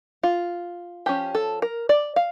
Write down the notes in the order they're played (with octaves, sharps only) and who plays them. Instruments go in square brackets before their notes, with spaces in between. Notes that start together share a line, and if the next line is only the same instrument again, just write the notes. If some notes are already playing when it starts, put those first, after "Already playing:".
[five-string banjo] F4
F3 C#4 G4
A4
A#4
D5
F5